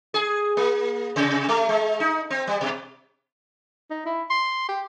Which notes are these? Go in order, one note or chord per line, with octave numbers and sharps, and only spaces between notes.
G#4
A#3
C3
A3
G#3
D#4
C4
G3
B2
D#4
E4
C6
G4